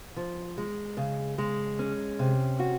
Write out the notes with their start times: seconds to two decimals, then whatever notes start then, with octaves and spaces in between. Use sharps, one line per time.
0.16 F3
0.58 G#3
0.97 C#3
1.38 G#3
1.79 C#4
2.19 C3
2.59 F#4